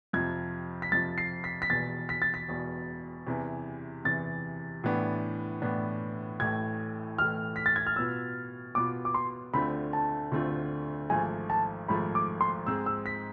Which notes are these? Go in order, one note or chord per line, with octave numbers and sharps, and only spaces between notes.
F2 C3 F3 G#6
B6
F2 C3 F3 A6
C7
B6
B6
E1 E2 B2 A6
B6
A6
B6
E1 E2 B2
E2 C3 E3
E2 C3 E3 A6
A2 E3 B3 D4
A2 E3 B3 D4
A1 A2 E3 A3 G#6
A1 A2 E3 A3 F6
B6
A6
G#6
F6
B2 B3 F4 E6
B2 B3 F4 D6
D6
C6
D2 D3 A3 C4 F4 B5
A5
D2 D3 A3 C4 F4
G#1 G#2 F3 A3 G#5
A5
G#1 G#2 F3 A3 B5
D6
C6
G#2 G#3 C4 G#4 E6
E6
B6